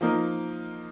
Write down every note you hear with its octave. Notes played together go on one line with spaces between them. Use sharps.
F3 A#3 D#4 A#4